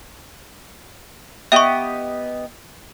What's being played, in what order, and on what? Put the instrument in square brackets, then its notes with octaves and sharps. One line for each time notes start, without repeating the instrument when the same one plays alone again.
[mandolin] B3 G4 D#5 [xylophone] E5 C#6